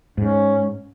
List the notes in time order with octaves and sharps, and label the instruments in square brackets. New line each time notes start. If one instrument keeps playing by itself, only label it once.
[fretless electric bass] G#2 [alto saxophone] C#4